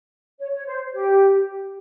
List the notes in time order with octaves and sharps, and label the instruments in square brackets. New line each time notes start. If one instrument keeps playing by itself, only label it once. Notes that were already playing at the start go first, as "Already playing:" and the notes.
[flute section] C#5
C#5
C5
G4